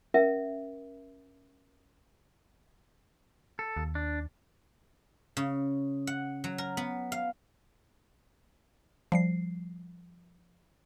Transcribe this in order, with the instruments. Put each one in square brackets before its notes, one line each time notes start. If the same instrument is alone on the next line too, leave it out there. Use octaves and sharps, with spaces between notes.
[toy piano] C#4 A#4 E5
[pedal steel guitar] A4
[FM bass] D#2
[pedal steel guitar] D4
[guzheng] C#3
F#5
F#3
A#4
B3
F5
[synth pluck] F3 G3 C7